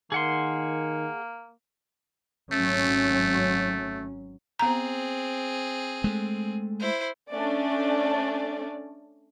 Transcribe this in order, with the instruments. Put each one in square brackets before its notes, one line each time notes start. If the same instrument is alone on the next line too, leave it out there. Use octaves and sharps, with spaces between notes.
[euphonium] D#3 [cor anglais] A#3 [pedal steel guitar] G#4 F#5 C6
[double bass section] G#1 F#3 C#4 [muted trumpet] A3
[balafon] B3 A#5 [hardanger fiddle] C4 G#4
[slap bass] G#3 A3
[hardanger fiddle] E4 C5
[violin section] A3 C#4 D4 D5